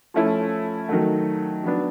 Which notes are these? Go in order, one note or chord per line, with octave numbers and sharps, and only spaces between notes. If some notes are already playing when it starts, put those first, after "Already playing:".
F3 A3 C#4 E4
D#3 F#3 A3
F#3 B3 D4